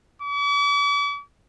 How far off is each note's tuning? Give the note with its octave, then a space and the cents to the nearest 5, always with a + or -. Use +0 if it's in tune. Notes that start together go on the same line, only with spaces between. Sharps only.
D6 -45